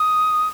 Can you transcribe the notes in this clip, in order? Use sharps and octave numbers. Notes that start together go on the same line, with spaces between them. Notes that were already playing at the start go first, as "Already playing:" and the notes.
Already playing: D#6